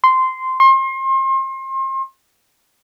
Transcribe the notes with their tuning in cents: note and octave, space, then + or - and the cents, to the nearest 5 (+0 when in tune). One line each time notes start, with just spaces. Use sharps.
C6 -10
C6 +35